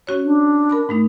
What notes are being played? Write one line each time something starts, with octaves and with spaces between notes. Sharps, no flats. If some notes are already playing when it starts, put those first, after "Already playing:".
C#4 F#4 C#5
D4
A#4 B5 D6
G#2 A3 D#4